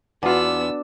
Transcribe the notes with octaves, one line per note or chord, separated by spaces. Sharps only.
E2 B3 D4 F4 F#4 F#5 E6